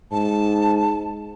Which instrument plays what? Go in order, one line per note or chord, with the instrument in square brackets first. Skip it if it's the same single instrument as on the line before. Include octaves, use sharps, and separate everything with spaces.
[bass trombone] G#2 [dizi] A5